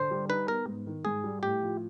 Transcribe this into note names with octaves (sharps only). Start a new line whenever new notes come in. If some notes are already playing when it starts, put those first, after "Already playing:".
Already playing: D3 C5
G3
D#4 B4
B3 A#4
G#2
D#3
G#2 G#4
G3
A2 G4
F3